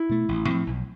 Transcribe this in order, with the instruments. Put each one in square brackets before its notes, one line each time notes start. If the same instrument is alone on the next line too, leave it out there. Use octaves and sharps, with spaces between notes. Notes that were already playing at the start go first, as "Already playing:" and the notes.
Already playing: [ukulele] E4
[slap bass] B2 A3
A1
A2 F3 C4
B1